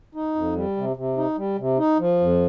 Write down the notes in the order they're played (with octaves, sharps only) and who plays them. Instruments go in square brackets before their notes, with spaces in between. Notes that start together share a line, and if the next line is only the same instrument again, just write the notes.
[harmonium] D#4
F2
G3
C3
C3
D#4
G3
C3
D#4
F3
F2